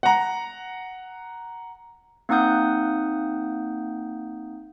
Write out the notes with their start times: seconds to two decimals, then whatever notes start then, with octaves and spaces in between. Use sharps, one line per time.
0.03 F#5 A#5
2.29 A#3 C4 D#4 F#5 D#6 G6